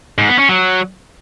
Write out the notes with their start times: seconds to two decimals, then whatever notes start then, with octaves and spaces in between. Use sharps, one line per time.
0.18 G#2
0.28 B3
0.39 C#4
0.49 F#3